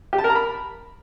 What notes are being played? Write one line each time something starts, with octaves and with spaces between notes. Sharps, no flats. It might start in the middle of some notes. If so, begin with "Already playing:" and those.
G4
A5
A#4
A#5
B5